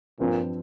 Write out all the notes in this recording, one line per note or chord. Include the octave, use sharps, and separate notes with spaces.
G2 A#2 F3 C4